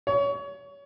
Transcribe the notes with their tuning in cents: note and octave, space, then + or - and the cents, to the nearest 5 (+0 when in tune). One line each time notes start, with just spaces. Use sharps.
C#5 +25